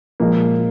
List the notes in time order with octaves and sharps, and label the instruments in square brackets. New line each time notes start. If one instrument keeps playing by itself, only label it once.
[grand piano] A#2 F3 G#3 A#3